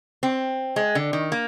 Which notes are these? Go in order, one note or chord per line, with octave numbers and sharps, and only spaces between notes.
C4
G#3
D3
D#3
A#3